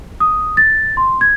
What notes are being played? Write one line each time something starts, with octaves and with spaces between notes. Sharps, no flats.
D#6
A6
C6
G#6